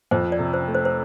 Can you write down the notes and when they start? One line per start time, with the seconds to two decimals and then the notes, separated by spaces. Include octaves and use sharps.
0.11 F2 C5
0.32 D5
0.39 C3
0.53 C5
0.68 A3
0.75 C5
0.85 C5